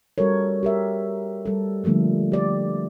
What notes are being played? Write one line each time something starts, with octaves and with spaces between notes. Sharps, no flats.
G3 F#4 A4 A#4 C#5
G4 A#4 E5
G3 A4
D3 F3 G3 A3 A#3
G4 D5